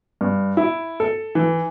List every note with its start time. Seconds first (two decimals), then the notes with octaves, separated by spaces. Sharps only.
0.21 G2
0.57 E4
1.00 A4
1.35 E3